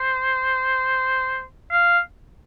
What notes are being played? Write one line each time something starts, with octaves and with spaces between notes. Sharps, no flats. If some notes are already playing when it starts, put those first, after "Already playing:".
Already playing: C5
F5